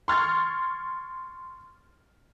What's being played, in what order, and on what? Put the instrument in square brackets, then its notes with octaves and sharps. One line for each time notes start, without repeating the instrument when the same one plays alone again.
[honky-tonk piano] C6 C#6 F6 G#6 A6